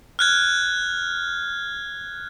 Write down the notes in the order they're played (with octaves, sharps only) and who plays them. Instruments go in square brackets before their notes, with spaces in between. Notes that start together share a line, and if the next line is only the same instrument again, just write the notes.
[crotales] F6 F#6 G#6